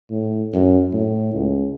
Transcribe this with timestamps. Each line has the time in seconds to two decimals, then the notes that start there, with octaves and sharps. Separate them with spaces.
0.11 A2
0.53 F#2
0.93 A2
1.34 C#2